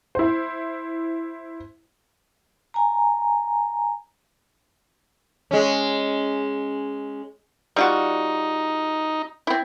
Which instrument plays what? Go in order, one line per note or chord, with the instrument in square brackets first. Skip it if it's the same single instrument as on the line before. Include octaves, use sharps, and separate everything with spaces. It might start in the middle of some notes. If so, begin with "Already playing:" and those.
[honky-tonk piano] E4 C5
[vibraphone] G#5 A#5
[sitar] G#3 C#4
[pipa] G3 F4 F#4 [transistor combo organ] D#4
[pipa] C4 E4